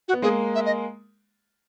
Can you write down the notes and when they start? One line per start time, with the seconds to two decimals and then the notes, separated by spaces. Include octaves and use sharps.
0.08 F#4
0.13 B3
0.22 G#3 A#3 G#4
0.55 E5
0.66 D#5